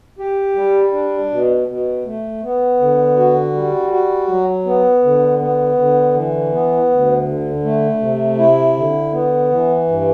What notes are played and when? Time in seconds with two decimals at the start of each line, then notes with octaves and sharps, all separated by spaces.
0.19 G4
0.56 G3
0.92 D4
1.31 B2
1.68 B2
2.05 A3
2.42 B3
2.80 D3
3.16 F#4
3.53 G3
3.90 F#4
4.28 F#3
4.65 B3
5.03 D3
5.41 B3
5.77 D3
6.14 E3
6.52 B3
6.89 D2
7.26 D3
7.63 A3
8.00 C3
8.38 E4
8.76 D3
9.12 B3
9.50 E3
9.87 G2